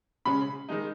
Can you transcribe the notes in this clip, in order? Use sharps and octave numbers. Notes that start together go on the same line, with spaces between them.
C#3 G#3 C#4 B5
D#3 G#3 D#4